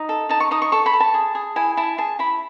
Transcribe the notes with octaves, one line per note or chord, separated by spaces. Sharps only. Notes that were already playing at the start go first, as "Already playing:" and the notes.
Already playing: D#4
A4
D#4 A5
C#6
D#4 D#6
C#6
A4 C#6
B5
A4
A5
G#4
G#4
E4 G#5
E4 A5
G#4 A5
E4 B5